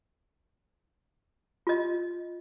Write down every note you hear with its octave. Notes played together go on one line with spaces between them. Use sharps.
F4 D#5